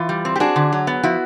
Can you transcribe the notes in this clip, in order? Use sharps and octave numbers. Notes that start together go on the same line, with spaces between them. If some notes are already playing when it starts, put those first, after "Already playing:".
Already playing: E3 F4
G3
C4
G4
D4 F#4 G#4
D3
F#3
B3
F3 E4 F#4